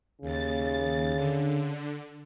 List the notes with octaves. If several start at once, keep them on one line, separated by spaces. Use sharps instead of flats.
D#2 C#3 A6
D3